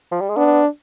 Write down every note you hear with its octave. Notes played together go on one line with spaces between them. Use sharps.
F3
G3
G#3
B3 D4